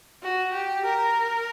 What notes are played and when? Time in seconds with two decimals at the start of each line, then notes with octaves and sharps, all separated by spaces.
0.23 F#4
0.53 G4
0.85 A#4